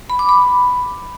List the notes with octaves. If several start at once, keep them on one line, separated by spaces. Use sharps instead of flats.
B5
D6
B5